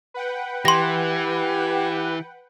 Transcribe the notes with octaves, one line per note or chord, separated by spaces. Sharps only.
B4 F#5 G5
E3 G4 C6 A#6